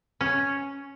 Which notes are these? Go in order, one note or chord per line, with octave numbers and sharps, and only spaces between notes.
C#4